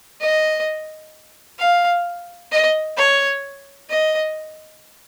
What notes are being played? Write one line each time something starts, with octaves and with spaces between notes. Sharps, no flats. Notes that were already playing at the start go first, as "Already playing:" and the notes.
D#5
F5
D#5
C#5
D#5